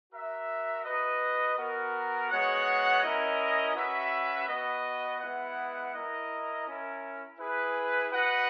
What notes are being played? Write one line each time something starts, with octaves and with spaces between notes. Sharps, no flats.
F#4 A#4 E5
F#4 B4 D#5
B3 F#4 A#4
G#3 B3 F#4 C#5 F#5
C#4 E4 A#4 D#5
C#4 F#4 B4 E5
B3 F#4 B4 D#5
G#3 B3 E4 B4 F#5
E4 A#4 D#5
C#4 E4 A#4
E4 G#4 B4
F#4 B4 D#5 F#5